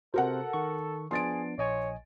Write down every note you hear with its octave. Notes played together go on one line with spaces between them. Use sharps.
C3 F#4 A4 A#4 C5 F#5
D#3 C#6
F3 B3 D4 G#4 C6 A6 D7
A#1 C#5 D#5 G#5